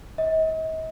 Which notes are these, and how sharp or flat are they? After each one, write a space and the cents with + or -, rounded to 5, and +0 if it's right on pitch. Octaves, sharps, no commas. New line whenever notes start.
D#5 +45